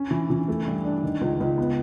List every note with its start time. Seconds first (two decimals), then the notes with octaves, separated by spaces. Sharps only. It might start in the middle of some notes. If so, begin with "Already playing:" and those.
Already playing: C#4
0.11 E3
0.30 E3
0.48 A3
0.67 G2
0.84 D4
1.03 D#3
1.21 C#2
1.40 C#2
1.58 B3